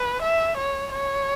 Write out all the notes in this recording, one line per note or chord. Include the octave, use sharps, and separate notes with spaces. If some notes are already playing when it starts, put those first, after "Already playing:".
Already playing: B4
E5
C#5
C#5